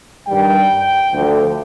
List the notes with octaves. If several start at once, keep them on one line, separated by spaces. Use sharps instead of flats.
G2 D#3 G3 G5
D2 D3 F3